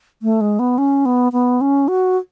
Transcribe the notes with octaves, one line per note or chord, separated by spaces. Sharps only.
A3
G#3
B3
C#4
B3
B3
C#4
F#4